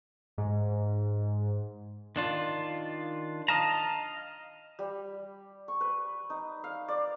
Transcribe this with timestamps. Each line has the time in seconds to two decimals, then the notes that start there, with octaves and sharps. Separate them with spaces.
0.38 G#2
2.16 D#3 D4 F4
3.48 D#5 F5 A5 A#5
4.79 G3
5.68 C#6
5.81 B4
6.30 D#4
6.64 F5
6.88 D5